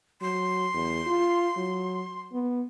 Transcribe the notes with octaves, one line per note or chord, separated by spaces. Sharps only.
F#3 C6
E2
F4
F#3
B3